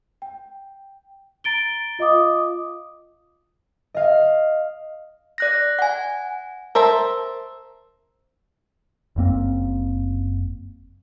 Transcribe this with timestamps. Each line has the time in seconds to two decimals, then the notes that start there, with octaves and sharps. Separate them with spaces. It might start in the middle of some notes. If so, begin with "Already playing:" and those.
0.22 G5
1.44 A#5 A6 D7 G7
1.99 F4 D#5 F5 D6 D#6
3.94 D#5 F5
5.38 D5 F#6 A#6
5.79 F#5 G#5
6.75 A#4 C5 E5 A5
9.16 F#1 F#2 A#3 C4